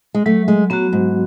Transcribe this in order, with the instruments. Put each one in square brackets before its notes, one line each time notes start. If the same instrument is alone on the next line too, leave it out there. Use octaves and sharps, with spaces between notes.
[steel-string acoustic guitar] G#3
[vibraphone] F#3 [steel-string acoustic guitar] A3
[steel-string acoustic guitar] G#3
[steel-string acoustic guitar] F#3 [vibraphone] B3 F#4
[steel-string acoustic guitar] G#2